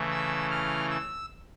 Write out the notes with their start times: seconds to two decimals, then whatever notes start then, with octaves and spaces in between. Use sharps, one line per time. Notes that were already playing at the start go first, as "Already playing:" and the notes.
Already playing: C#3 E3 A3
0.11 E6
0.51 F6
0.90 E6